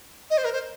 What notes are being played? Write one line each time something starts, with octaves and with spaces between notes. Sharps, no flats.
D#5
C5
A#4
C5